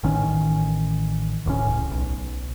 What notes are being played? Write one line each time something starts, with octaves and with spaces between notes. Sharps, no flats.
A1 D#3 C#4
D1 C#2 A2 C#4
B1